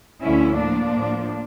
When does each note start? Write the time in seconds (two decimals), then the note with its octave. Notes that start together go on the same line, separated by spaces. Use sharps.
0.22 D2 D3 F3 C#4 E4
0.58 A2 F3 A#3 D4
0.94 A2 F3